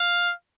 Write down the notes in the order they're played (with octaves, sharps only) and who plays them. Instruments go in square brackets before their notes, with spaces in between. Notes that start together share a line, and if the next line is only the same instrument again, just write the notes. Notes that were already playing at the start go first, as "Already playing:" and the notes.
Already playing: [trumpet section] F5